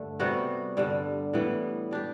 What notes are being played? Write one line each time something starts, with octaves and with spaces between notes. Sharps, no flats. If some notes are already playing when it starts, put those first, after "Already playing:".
Already playing: G2 D3 A3
C3 G3 B3 F#4
G2 D3 G3
A2 E3 G3 B3
G3 D4 G4